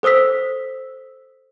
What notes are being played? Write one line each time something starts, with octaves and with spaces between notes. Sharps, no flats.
A4 C5 D#6 E6 B6